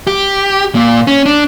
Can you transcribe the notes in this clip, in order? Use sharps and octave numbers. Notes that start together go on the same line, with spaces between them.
G4
A#2
C#4
D4